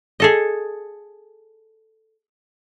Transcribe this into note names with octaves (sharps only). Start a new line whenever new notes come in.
G#4 A4 D#5